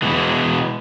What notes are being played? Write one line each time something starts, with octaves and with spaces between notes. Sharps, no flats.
B2 E3 G#3